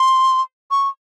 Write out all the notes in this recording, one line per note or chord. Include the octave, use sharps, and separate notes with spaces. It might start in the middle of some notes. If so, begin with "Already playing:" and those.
Already playing: C6
C#6